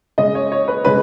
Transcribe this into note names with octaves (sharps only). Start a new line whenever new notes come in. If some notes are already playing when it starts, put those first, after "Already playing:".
C#3 G#3 D#5
C#5
C#5
B4
C#3 G#3 B4